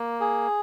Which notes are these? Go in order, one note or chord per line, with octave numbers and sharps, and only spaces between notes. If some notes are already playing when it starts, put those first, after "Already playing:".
Already playing: A#3
G#4